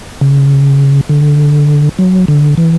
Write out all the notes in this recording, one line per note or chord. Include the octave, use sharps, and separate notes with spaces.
C#3
D3
F#3
D3
E3